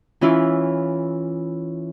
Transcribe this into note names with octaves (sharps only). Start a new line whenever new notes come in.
E3 C#4 E4 F4